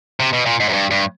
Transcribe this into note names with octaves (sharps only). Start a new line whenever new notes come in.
C3
B2
A#2
G#2
F#2
G2
G2